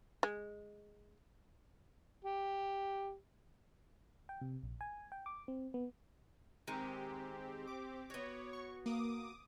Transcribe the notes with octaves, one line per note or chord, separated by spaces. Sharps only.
G#3
G4
G5
C3
A#1
G#5
G5
D6
C4
B3
D#3 G#3 C4 G4
D6
B3 F#4 C#5
C#6
A#3 D6 D#6